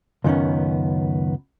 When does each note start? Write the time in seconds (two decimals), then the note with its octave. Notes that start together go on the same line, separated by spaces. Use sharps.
0.24 C#2 F#2 D#3 B3 C#4